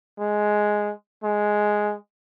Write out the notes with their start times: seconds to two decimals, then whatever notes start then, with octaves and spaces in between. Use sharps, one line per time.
0.19 G#3
1.24 G#3